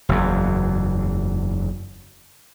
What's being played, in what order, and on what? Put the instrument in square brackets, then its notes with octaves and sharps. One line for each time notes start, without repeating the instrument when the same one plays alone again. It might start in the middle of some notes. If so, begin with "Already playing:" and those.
[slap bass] F#1 E2